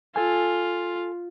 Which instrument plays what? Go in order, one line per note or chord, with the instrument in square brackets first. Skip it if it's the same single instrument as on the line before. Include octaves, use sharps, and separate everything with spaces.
[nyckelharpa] F4 [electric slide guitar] A4 G#5